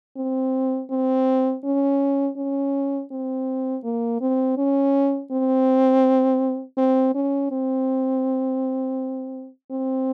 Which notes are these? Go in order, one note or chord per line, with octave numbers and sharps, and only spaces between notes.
C4
C4
C#4
C#4
C4
A#3
C4
C#4
C4
C4
C#4
C4
C4